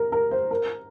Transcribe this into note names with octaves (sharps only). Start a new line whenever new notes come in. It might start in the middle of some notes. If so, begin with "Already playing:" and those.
Already playing: A#4
A#4
C5
A#4